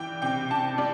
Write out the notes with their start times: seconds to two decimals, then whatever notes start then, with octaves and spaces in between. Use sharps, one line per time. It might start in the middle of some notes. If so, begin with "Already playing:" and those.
Already playing: E3 G3 G5
0.22 C3 G5
0.51 C3 A5
0.78 G3